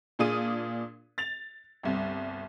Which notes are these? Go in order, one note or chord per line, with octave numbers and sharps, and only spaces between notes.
A#2 D4 F4 G#4 D#6 D#7
A6 F7
G1 C2